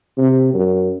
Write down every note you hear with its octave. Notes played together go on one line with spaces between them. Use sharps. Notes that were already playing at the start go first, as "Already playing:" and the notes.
C3
F#2